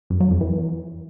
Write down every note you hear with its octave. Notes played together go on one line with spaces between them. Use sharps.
F#2
F#3
F2
E3